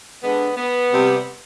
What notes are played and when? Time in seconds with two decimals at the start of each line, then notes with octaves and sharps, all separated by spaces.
0.23 D3 G#3 B3
0.57 B3
0.91 C3 G3